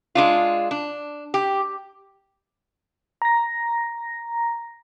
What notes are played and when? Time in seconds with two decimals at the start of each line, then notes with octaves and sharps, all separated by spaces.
0.15 G#3 D4 F4
0.71 D4
1.34 G4
3.22 A#5 A#6